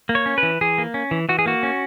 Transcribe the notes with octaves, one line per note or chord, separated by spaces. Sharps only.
A#3
C#5
C#4
B4
E3
E3 G#4
A#3
C#4
E3
E3 F#4
G#4
A#3 F#4
C#4